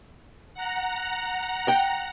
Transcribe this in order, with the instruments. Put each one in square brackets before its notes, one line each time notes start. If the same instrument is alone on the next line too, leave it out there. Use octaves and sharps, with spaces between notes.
[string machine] F#5 A#5
[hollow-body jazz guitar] G5